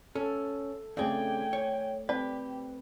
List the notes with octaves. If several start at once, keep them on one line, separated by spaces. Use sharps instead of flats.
C#4 A4
C#3 A3 C4 G#4 C5 D5 G5 G#5
C#5
C4 G4 B4 D5 A5